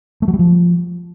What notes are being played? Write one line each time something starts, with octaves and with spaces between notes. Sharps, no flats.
A3
F#3
G3
F3